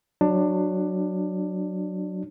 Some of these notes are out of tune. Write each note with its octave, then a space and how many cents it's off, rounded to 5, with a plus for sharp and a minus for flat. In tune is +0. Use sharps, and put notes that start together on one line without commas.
F#3 +0 D4 +20